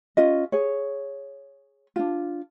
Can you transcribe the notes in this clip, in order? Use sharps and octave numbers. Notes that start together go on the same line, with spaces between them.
C#4 F4 D#5
G#4 C#5
D4 F4